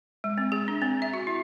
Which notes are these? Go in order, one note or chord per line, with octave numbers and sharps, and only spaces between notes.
G#3
C4
G#4
D4
C4
E5
F#4
E4